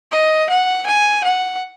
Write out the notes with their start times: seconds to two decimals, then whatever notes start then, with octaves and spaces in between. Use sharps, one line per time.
0.11 D#5
0.49 F#5
0.86 G#5
1.24 F#5